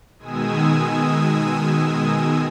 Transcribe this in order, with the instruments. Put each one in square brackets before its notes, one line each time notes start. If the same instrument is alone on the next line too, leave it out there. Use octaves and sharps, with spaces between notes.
[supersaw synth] B2 D#3 G#3 G#5 D#6 E6